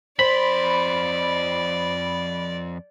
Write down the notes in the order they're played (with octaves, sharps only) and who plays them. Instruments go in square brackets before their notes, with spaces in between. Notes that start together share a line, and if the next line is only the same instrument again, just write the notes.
[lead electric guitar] F2 C6 [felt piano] C5 [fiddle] D5 [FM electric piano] B5